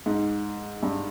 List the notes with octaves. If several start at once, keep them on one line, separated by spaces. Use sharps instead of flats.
G#2
G2